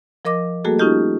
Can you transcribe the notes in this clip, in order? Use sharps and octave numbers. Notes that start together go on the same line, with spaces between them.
F3 A#4 D#5 D6 A#6
G3 A3 A#3 F#4 G#4 A4
C#4 D#4 F4 G4 D#5